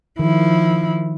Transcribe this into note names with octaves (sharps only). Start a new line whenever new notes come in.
D#3 F3 E4